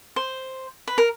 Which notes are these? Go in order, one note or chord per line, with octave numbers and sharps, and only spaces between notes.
C5
B4
A#4